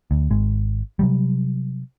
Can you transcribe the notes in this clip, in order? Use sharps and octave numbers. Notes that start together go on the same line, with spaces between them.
D2
G#1 G#3
C3 F#3 G3